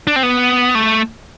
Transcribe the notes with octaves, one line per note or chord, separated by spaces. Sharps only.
D4
C4
B3
A3